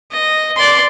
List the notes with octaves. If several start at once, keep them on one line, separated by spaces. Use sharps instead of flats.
D#5
D5 C6